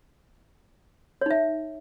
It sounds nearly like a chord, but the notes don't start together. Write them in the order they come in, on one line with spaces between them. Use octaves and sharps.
C#5 D#4 E5